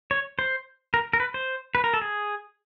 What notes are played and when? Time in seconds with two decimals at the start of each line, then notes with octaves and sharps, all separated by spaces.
0.11 C#5
0.39 C5
0.94 A#4
1.13 A#4
1.20 B4
1.34 C5
1.75 B4
1.84 A#4
1.94 A4
2.02 G#4